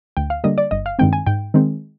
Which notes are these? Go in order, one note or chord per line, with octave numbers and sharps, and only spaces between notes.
D2 G5
F5
D3 G3 A#3 D#5
D5
G1 D#5
F5
G2 D#3 G#3 C4 G5
G#5
G#2 G5
D#3 G#3 C4